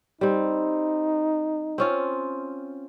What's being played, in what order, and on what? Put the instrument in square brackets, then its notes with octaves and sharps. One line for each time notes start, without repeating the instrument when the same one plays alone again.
[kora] G3 C4 [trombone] D#4
[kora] C4 C#4 F4